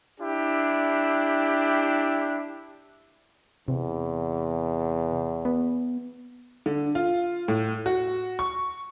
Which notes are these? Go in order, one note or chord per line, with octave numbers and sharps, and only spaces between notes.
D4 E4 G4
E2 C3
B3
D3
F4
A2
F#4
C#6